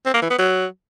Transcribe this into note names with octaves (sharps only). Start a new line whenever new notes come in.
C4
A#3
E3
B3
F#3